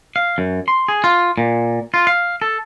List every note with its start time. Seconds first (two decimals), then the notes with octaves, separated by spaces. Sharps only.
0.16 F5
0.38 F#2
0.68 C6
0.88 G#4
1.04 F4
1.38 A#2
1.94 F4
2.07 F5
2.42 A4